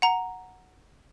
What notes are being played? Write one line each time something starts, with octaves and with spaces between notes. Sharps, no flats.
F#5 A#5